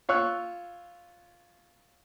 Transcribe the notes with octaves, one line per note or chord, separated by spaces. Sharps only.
F4 C#5 E6 F#6